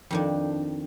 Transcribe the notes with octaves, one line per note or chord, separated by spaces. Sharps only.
F2 D#3 D4